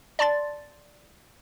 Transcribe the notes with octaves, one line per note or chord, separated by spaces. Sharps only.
D5 A5 C6 A6